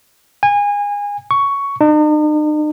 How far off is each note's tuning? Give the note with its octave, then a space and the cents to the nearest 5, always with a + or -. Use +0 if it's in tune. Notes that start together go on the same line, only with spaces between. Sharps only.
G#5 -25
C#6 +10
D#4 -45